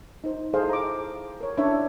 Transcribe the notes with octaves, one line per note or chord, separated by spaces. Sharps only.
D#4 C5
E4 G#4 A4 C5 D#5 F5
A#5 D6
A#4 C#5
C#4 D4 E4 B4 C#5 E5